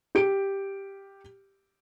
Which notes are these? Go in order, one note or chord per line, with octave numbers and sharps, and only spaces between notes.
G4 D7